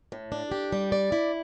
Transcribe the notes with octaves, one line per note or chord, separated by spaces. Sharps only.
A2
D4
G4
G3
D5
E4